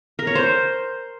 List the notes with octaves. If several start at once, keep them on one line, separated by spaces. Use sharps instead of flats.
A#4
C#5
C5